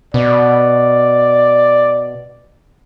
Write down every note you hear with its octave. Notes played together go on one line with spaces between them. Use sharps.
B2 D5